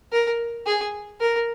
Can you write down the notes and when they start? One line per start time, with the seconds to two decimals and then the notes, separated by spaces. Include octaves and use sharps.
0.12 A#4
0.67 G#4
1.21 A#4